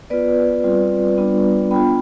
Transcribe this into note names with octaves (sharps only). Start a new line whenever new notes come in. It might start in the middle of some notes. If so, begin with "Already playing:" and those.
B3 F4 B4 D5
G3 C4 F4
G3 B3 D4 F4
B3 D4 F4 G5 B5